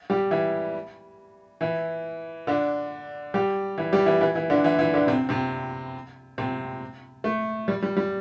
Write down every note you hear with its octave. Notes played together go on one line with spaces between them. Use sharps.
G3 G4
E3 E4
E3 E4
D3 D4
G3 G4
E3 E4
G3 G4
E3 E4
E3 E4
E3 E4
D3 D4
E3 E4
E3 E4
D3 D4
C3 C4
C3 C4
C3 C4
A3
G3
G3
G3